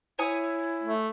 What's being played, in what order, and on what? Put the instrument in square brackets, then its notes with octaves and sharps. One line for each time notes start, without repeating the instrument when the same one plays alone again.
[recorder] E4 [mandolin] C#5 G#5 D#6
[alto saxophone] A3